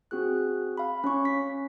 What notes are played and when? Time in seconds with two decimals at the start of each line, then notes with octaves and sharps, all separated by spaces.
0.11 C4 F#4 G#4 F#6
0.77 F5 B5
1.04 C#4 C#5 C#6
1.25 B6